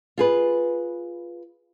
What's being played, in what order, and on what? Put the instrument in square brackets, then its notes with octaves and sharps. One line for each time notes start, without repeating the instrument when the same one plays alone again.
[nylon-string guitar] F4 G#4 B4